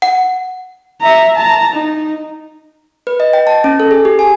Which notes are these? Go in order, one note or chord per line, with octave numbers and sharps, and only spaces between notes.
F#5
E5 A#5
A5 A#5
D#4
B4
D#5
G5
A5
C#4
A4
G#4
G4
G#5